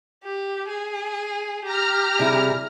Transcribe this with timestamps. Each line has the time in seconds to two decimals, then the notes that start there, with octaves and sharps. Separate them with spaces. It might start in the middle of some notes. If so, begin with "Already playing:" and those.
0.24 G4
0.68 G#4
1.64 G4 A#5 F6
2.19 C3 G3 E4 G#4